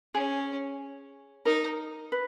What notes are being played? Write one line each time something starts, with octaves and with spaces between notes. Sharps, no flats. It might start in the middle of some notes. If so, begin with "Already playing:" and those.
C#4 G#4
D#4 A#4
B4